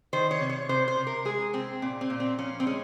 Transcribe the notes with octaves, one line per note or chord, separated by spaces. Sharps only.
D#3 C5
C#5
C3
C#5
C3 C5
C5
C3
A#4
G#3 G#4
C3 C4
A#2 C4
C4
A#2
C4
F3 C#4
C4
G#3 C#4